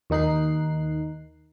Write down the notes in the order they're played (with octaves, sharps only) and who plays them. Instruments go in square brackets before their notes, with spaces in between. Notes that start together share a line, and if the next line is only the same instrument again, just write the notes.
[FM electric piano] D#2 D#3 D#4 F#6 C7